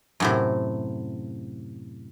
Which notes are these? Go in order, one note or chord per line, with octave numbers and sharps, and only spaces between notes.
F#2 A2 C3